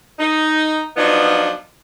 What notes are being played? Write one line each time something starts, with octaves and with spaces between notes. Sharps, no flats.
D#4
F3 F#3 B3 D4 D#4 F4